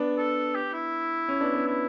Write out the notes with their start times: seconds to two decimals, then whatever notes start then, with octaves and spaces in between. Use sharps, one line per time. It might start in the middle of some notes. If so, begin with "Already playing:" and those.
Already playing: B3 D4
0.18 A4
0.55 G4
0.73 E4
1.29 C#4
1.41 B3 D4
1.53 B3
1.66 E4